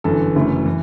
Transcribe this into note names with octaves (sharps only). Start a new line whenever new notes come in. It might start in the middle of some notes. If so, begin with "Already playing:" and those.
G1 F#2 E3 A4
F#1 F#2 E3 A3
E3